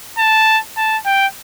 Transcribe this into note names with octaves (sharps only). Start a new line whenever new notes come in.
A5
A5
G5